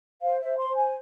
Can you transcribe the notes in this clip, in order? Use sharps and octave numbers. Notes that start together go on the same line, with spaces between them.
C5 F5
C5 E5
C6
C5
G#5